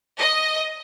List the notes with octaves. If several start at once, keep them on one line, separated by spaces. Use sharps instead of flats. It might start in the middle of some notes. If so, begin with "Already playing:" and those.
D#5